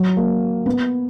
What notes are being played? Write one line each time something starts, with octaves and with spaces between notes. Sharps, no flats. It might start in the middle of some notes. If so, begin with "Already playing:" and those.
Already playing: F#3
A#3
B3